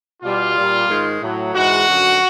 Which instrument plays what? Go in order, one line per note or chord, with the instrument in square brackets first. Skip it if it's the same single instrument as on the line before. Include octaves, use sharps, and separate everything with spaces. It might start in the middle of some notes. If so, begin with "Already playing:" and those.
[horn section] B2 G3 F4
A#2 G3
G#2 D#3 G#3
A2 F#3
G#2 E3 G#3 F#4
F#2 D3 F3